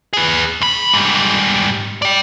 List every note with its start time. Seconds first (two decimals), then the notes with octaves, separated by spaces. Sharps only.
0.13 G#4 B4
0.61 D#2 B5
0.94 G#2 G3
2.02 D5 G5